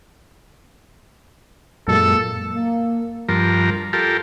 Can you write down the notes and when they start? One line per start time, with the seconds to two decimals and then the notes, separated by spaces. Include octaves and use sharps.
1.88 F#2 A#2 G#3 A#3 A4
2.54 A#3
3.29 G2 F3 A#4
3.93 F4 G4 A4 A#4